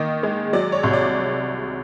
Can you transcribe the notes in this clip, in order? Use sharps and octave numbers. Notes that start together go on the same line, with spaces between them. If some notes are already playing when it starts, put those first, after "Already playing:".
Already playing: D#3 A#3 D#5
G#3
F#3 D5
C#5
C2
D5